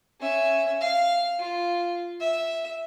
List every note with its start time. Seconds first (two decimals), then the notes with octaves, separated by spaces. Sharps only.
0.21 C#4 E5
0.81 F5
1.39 F4
2.20 E5